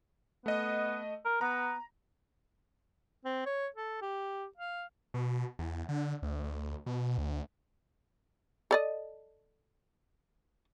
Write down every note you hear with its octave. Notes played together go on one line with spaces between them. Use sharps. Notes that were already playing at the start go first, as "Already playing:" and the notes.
A3 B3 D#5
A#4
B3 A#5
C4
C#5
A4
G4
F5
B2
E2
D3
D2
D2
B2
D2
A4 D5 D#5